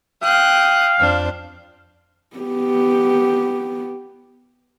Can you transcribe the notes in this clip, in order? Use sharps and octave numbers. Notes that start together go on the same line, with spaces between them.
F5 G5 D#6 F#6
F2 D4 C5
B3 G4